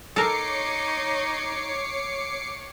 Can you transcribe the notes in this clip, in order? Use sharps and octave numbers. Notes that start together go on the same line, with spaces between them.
D#4 A4 A#4 C#5 D6 C7 C#7